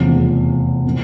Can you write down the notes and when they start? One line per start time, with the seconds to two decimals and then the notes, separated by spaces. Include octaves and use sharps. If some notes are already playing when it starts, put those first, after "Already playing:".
Already playing: F1 E2 C#3 F3
0.86 A#2 F3